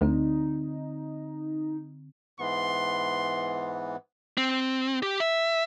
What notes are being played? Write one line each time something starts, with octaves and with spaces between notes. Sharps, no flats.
D2 D3 C4 D#4
G#2 E3 B3 C6
C4
G4
E5